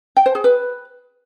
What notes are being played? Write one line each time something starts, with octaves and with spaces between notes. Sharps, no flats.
G5
C5
G#4
B4